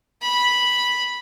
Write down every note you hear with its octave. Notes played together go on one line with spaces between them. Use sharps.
B5